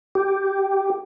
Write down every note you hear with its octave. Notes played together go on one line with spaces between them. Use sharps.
G4